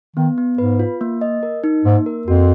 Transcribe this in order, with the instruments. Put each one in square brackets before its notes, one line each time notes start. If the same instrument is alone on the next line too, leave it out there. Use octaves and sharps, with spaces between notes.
[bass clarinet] D#3 [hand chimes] B3
[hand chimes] B3
[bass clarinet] G#2 [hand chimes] B4
[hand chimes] F4
A#3
D#5
A#4
D#4
[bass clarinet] G#2 [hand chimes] A#3
[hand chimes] A#4
[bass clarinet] F2 [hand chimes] F#4